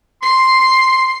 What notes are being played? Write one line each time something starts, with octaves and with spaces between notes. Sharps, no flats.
C6 C7